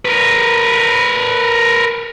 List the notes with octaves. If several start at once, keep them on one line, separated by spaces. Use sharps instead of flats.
A#4 B4